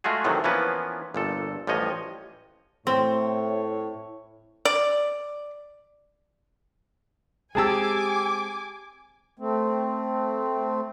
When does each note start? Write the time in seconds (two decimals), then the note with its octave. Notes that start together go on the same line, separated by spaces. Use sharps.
0.04 G#3 A3 F4 F#4 G#4
0.24 A2 C3 D#3 E3 F#3 A3
0.44 E3 F3 A#3 B3 C#4 B4
1.14 G1 A#2 A4
1.67 A1 F3 G3 C#5 D#5
2.87 A2 C4 C#5
4.65 D5
7.55 G#3 C4 G4 G#4 G#5 A5 D6 E6
9.39 A3 C4